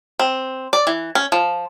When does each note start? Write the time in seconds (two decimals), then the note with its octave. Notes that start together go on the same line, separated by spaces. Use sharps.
0.19 C4
0.73 D5
0.87 E3
1.15 C#4
1.32 F3